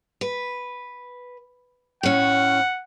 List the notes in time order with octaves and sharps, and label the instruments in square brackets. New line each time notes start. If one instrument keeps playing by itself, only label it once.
[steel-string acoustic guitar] B4
[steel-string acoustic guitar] A2 C#4 [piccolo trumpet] F#5